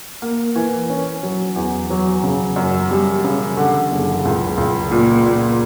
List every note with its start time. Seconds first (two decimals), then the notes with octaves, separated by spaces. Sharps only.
0.22 A#3
0.56 E3
0.90 C#4
1.23 F#3
1.56 E2
1.90 F#3
2.23 C#3
2.56 F#2
2.91 G3
3.24 C#3
3.57 D3
3.91 F#1
4.25 C#2
4.57 C#2
4.91 A#2
5.25 A#2